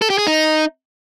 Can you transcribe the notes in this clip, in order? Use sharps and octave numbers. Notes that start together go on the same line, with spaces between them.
A4
G4
G#4
D#4